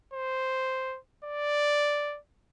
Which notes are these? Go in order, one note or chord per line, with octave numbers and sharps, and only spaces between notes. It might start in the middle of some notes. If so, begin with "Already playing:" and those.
C5
D5